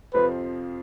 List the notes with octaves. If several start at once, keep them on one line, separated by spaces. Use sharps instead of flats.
F2 C3 F3 C4 B4